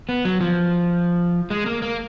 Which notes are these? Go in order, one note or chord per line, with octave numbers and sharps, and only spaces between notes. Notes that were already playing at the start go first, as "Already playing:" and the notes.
B3
F#3
F3
G#3
A#3
A#3